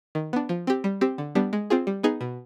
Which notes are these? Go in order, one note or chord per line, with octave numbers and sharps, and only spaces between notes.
D#3
B3 D4
F3
C4 G4
G3
C4 G4
D3
G3 B3 D4
G#3
C4 F4 G#4
G3
B3 D#4 G#4
B2